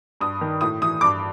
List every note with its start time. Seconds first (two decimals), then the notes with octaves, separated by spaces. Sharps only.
0.21 G2 D#6
0.41 D#3
0.61 A2 D#6
0.82 E3 D#6
1.01 G2 D6